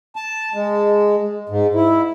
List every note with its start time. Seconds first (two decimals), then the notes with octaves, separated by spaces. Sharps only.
0.16 A5
0.54 G#3
1.49 G#2
1.75 E4